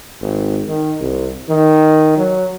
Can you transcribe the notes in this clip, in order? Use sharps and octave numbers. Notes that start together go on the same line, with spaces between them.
G#1
D#3
C2
D#3
F#3